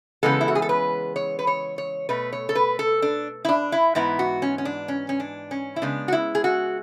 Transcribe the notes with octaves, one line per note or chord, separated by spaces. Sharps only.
C#3 E3 G#3 B3 A4
E4
F#4
G#4
A4
B4
C#5
B4
C#5
C#5
B2 A3 B4
C#5
A4
B4
A4
D4
E4
D4
E4
G#2 E3 B3 E4
F#4
C#4
C#4
D4
C#4
C#4
D4
C#4
E4
C#3 G#3 B3 D4
F#4
E4
G#4
F#4